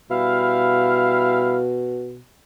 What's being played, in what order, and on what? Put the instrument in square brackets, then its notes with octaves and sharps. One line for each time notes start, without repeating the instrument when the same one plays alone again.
[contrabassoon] B2 [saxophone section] G3 E4 F5